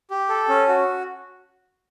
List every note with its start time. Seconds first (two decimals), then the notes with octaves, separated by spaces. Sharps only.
0.10 G4
0.29 A4
0.49 C#4
0.68 F#4